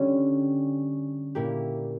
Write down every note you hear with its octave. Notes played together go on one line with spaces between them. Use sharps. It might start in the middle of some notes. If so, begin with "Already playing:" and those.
Already playing: D3 G3 C#4
A#2 A#3 E4 G4